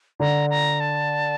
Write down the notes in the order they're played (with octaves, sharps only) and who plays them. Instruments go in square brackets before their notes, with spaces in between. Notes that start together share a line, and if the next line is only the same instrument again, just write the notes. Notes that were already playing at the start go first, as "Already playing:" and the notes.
[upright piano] D3 [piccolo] A#5
[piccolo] A#5
A5